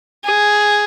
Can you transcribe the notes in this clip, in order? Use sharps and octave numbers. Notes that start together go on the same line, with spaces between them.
G#4